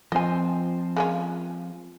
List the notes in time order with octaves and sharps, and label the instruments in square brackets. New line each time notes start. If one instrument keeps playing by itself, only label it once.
[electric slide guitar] F3 C4 [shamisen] D#5 G#5
[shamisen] G#3 A#3 C#4